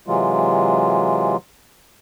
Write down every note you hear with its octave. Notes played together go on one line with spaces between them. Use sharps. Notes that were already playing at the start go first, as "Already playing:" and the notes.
C3 E3 F#3 G#3 F4